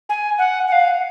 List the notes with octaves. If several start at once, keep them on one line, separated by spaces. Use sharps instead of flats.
G#5
F#5
F#5
F5